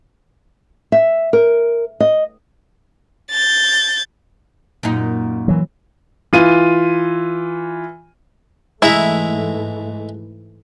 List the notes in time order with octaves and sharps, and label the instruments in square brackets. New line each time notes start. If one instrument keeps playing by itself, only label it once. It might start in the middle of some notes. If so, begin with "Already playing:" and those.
[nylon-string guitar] E5
A#4
D#5
[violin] G6 A6
[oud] F#2 A#2 D#4
[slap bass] E3 F#3
[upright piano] E3 F4 D#7
[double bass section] G#2 E3 A3 [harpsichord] G#3 E5 A#5 [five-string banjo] E4